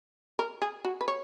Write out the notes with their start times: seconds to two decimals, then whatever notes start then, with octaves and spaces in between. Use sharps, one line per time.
0.39 A#4
0.62 G#4
0.85 F#4
1.01 B4
1.08 C#5